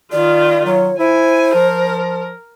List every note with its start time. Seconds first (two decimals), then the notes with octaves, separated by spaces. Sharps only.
0.12 D#3 F4 D5
0.66 F#3 C#5
0.99 E4 C5 G#5
1.55 F3 A#4